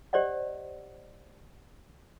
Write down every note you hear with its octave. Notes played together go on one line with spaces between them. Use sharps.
G4 C5 D5 D#5 F#5